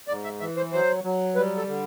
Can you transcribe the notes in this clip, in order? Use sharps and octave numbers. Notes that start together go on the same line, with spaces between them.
G#2 D5
E5
E3 E5
C5
F#3 C5
F#3
G3 B4
A4
D3